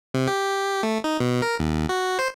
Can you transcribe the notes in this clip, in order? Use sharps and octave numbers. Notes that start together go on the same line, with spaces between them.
C3
G4
A3
D#4
B2
A#4
D#2
F#4
C5